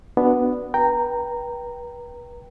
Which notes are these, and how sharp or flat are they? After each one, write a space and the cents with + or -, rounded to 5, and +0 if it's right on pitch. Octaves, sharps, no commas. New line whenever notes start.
B3 +0 D4 +0 F#4 +0
B4 -35 G5 +0 A#5 -15